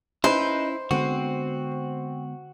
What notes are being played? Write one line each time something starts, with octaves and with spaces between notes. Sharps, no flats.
C#4 D#4 E4 B4 C5
D3 G#3 B3 C4 F#4